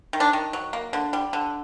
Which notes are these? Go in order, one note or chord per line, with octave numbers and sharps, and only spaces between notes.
D#3
D4
D#3
F#3
A#3
D3
G3
D3